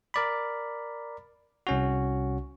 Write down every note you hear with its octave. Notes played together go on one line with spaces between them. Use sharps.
A#4 D5 B5
C2 C#4 F#4